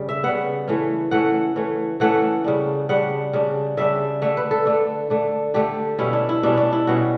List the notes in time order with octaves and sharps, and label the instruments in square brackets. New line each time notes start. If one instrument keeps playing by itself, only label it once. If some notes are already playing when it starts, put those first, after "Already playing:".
Already playing: [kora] C#3 G3
E5
C#3 G3 B3 F#5
E3 A3 C#4
E3 A3 C#4 F#5
E3 A3 C#4
E3 A3 C#4 F#5
C#3 G3 D4
C#3 G3 D4 F#5
C#3 G3 D4
C#3 G3 D4 E5
D3 A3 D4 E5
B4
A4
D3 A3 D4
D3 A3 D4
D3 A3 D4 G4
B2 G3 C#4 E4
D4
E4
B2 G3 C#4 D4
D4
E4
B2 G3 C#4 F#4